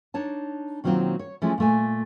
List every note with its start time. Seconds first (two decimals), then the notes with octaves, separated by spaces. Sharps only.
0.14 D4 D#4 C#5 A5
0.84 B2 D#3 F#3 A#3 C4 F4
1.19 C#5
1.42 E3 F3 G#3 A3 C#4
1.58 A#2 A3 G#5